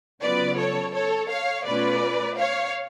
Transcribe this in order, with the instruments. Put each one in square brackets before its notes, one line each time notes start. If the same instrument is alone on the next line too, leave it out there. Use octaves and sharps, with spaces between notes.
[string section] C#3 F#3 B3 F4 B4 D5
A4 C#5
A4 C#5
C#5 F5
B2 A3 C#4 F4 B4 D5
C#5 F5